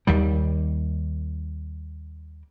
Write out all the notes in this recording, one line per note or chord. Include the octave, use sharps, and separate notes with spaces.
D#2 D#3 G3